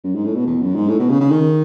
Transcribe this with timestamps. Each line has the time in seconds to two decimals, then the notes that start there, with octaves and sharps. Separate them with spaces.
0.04 F#2
0.15 G#2
0.25 A2
0.35 B2
0.47 E2
0.61 F#2
0.75 G#2
0.89 A2
0.99 B2
1.10 C#3
1.20 C#3
1.31 D#3